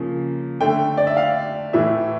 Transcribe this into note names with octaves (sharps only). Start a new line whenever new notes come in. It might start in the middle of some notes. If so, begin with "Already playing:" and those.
Already playing: C#3 F3 A#3
D3 A3 G5
D5
E5
F5
A2 E3 A3 E5